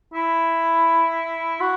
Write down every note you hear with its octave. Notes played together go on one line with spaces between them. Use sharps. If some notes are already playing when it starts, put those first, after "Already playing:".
E4
F#4